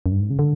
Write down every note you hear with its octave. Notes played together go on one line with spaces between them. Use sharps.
F#2
G2
G#2
C#3
D3